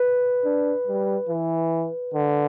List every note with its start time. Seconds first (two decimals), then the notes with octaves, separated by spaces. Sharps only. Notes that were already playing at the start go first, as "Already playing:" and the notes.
Already playing: B4
0.45 D4
0.87 G3
1.29 E3
2.14 D3